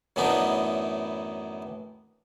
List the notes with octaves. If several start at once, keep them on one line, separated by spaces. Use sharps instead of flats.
F#2 A2 E3 B3 D4 D#4